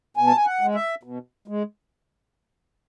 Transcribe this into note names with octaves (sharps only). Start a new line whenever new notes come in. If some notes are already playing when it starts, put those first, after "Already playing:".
B2 G#5
A5
G#5
F#5
G#3
E5
B2
G#3